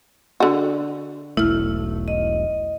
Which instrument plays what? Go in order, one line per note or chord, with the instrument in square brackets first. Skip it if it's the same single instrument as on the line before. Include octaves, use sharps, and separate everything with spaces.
[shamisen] D3 F#4
[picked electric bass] E1 B1 A3 [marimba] E4 F6
[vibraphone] D#5